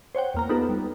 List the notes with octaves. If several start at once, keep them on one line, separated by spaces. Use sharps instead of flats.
C5 C#5 F#5 G5
E2 A#3 A#5
B3 D#4 F4 G4 A4 B4
G3